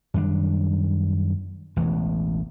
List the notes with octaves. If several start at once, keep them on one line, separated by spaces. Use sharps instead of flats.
F#2 D#3 G3 D4
E1 A1 E2 E3